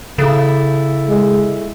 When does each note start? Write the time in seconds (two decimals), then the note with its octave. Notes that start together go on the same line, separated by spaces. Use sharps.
0.18 C#3 E4 G4 A4
1.09 G#3